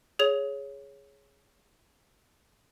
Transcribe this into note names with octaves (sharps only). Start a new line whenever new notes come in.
G#4 C#5 F7